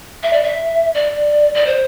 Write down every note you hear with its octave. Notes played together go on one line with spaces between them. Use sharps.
E5
D5
E5
D5
D5
C5